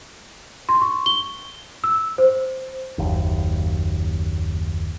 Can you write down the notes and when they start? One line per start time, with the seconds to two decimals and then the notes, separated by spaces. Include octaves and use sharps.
0.69 C6
0.81 C#6
1.06 G7
1.84 E6
2.18 C5
2.98 F#1 D#2